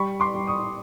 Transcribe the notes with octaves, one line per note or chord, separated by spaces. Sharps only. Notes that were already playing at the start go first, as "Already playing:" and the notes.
Already playing: G3 B5 C#6
C6 D6
G3
C#6 D#6